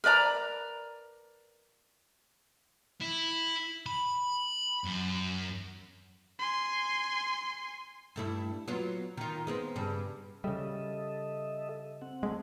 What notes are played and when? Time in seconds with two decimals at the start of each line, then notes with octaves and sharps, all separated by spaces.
0.04 A#4 B4 D5 A#5
3.01 E4
3.86 B5
4.84 F#2
6.39 G#5 C6
8.16 G2 A3 E4
8.68 F#3 B3 F4
9.17 D#3 F4
9.47 G#3 B3 C4
9.76 G2 C#3
10.44 C#3 G3 A4 D#5 E5
12.02 C4 F#5
12.23 G#3 A3